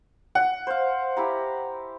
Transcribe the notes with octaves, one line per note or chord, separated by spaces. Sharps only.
F#5
C5 F5
E4 G4 A#5